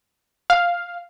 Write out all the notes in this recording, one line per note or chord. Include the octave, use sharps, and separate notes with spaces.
F5